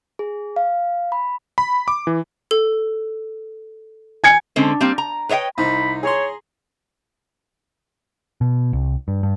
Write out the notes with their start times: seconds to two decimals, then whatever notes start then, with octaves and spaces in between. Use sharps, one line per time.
0.19 G#4
0.56 F5
1.12 B5
1.58 B5
1.88 D6
2.07 E3
2.51 A4
4.24 G#5 G#6 C#7
4.56 D3 G#3 C4 C#4
4.81 G3 A#3 C4
4.98 A#5
5.29 B4 C#5 D#5 E5 G5
5.58 C2 D#4 C5 B5
6.03 G#4 C#5 A#5 C6
8.41 B2
8.73 C2
9.08 G2
9.23 G2